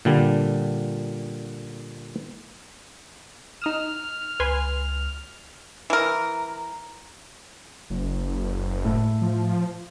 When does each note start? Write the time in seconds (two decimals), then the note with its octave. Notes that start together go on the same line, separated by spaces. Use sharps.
0.05 A#2 D3 G3
3.62 D#4 D#6 F6 E7
4.40 C#2 B4 G#5 C6
5.90 E3 A#4
7.90 F#1
8.85 A2
9.21 F3